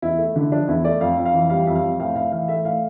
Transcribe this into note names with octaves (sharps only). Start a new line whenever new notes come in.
E2 E4
A3
D3 E4
F3 D4
E2 E4
A3 D5
F2 F5
F2
F5
E3
G3 F5
F2 E5
F5
F2
A2 F5
A2 F5
E3 F5
A3 E5
A2 F5